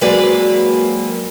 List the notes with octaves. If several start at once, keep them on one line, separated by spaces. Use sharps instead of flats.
F#3 G#3 A#3 C4 B4 D5